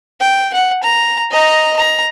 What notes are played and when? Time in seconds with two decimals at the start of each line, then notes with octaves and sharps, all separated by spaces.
0.20 G5
0.54 F#5
0.83 A#5
1.31 D#5 A#5
1.76 A#5